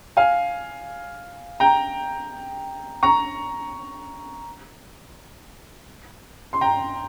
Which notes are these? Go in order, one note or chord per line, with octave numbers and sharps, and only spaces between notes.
F5 G#5
G5 A#5
A#5 C#6
C6
G5 A#5